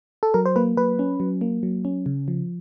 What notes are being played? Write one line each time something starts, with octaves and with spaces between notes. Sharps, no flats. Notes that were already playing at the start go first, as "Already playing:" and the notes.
A4
F#3 A#4
C5
A#3 B4
F#3 B4
C#4
F#3
A#3
F#3
C#4
C#3
F3